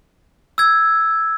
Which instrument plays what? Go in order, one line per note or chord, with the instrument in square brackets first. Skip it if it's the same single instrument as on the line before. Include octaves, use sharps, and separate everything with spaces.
[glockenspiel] E6 G#6